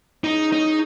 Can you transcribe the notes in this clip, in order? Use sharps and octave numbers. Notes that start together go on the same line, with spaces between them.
C#4 D#4 G#4 C#5
D#4